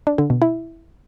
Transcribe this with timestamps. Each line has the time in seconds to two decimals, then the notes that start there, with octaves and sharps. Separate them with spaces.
0.07 D4
0.18 D3
0.30 B2
0.42 E4